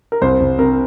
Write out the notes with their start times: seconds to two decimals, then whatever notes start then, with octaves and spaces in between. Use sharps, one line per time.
0.12 A#4
0.21 C2 C5
0.40 C2
0.58 C3 A#4